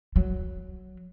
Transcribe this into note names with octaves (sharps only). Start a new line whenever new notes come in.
F#3